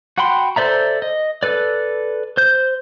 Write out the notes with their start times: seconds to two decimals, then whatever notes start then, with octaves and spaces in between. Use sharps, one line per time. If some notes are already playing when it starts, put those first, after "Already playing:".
0.18 F#4 F#5 G5 B5 C6
0.56 A4 C5 D5 E5 A#5
1.02 D#5
1.43 A4 B4 D5
2.37 C5 G6